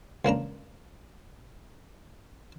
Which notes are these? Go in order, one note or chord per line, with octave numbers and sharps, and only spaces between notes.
C#2 A#3 D4 A#5